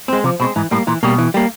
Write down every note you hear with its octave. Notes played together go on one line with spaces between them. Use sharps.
G#3 C4
C3 F3
B2 G#3 C4
G#2 E3
A2 G3 A#3
A#2 E3
B2 G3 A#3
E3
G3 A#3